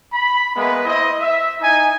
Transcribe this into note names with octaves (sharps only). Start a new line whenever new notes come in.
B5
G#3 A#3 B3 B4 E5
E4 C5 D#5
E5
D#4 E4 G#5